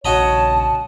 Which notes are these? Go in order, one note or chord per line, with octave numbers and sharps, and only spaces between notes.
A#1 C#3 F#4 C#5 D#5 A5 A#5